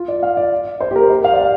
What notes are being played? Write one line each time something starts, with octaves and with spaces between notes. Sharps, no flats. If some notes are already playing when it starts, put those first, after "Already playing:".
Already playing: F4
D5
F5
D5
C5
G4
A#4
C5
F5
D5
F5